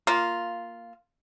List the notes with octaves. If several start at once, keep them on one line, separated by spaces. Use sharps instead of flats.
A#3 F4